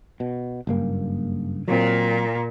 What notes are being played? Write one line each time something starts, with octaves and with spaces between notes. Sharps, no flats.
B2
F#1 G2 A#3
A#2 F#3 C4